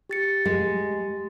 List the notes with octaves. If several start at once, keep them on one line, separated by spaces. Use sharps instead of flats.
G4 A6 C#7
G#3